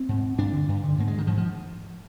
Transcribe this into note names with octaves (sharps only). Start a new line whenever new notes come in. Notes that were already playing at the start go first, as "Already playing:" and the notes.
Already playing: C4
G#2
G2 D4
D3
G2
D3
G#2 A#3
G#3
D#3
G#2 F3
F3